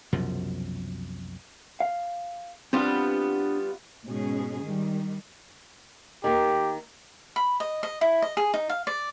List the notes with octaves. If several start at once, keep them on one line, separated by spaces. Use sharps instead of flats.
C2 F#2 B2 F3
F5
G3 B3 C4 D4 F4
G#2 B2 C#4 G#4
D#3 G3
D#3 A#3 G4
B5
D#5
D#5
E4
D#5
G#4
D#4
F5
D5